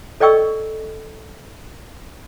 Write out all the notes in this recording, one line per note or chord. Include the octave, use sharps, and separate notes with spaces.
A4 D5 D#5 G5 C#6 E6